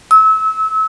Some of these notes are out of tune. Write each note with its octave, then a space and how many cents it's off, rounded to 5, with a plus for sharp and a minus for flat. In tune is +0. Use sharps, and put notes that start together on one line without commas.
E6 -30